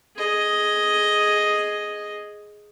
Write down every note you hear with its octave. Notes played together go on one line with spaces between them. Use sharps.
G#4 D#5